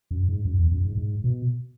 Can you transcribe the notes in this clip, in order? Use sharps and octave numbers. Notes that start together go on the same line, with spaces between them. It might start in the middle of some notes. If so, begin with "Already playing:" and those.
F#2
G#2
F#2
E2
F#2
G#2
G#2
B2